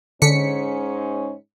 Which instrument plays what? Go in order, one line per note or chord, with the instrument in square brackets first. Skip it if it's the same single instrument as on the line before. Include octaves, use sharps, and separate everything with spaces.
[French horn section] G#2 C#4 [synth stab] D3 B6 C#7